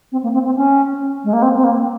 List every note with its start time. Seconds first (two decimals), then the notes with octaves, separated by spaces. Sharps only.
0.12 C4
0.23 A#3
0.33 C4
0.45 C4
0.55 C#4
1.24 G#3
1.33 A#3
1.42 C4
1.56 C4
1.64 A#3